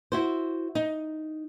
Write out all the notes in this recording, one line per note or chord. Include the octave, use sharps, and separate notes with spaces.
E4 F#4 C5
D#4